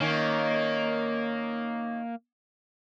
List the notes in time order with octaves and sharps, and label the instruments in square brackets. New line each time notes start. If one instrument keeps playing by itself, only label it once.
[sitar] D#3 C#4 [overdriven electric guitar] A#3